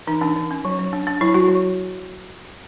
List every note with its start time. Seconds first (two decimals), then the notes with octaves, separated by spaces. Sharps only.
0.07 E3 D#4
0.21 E3 D4
0.36 E3
0.51 C#4
0.65 F#3
0.79 F#3
0.93 D4
1.07 D4
1.21 F#3 E4
1.34 F#3 F#4
1.49 F#3